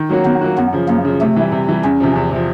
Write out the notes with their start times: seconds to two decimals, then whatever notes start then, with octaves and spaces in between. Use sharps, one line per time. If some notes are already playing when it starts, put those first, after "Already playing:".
Already playing: D#3
0.09 F#3 A#3 C#4 F#4
0.25 D#3 B3
0.41 F#3 A#3 C#4 F#4
0.57 F#2 B3
0.73 C#3 F3
0.88 F#2 A#3
1.05 C#3 F3
1.21 C3 A3
1.36 E3 G3
1.52 C3
1.68 E3 G3
1.84 E2 C#4
2.00 C3 F3
2.15 E2
2.31 C3 F3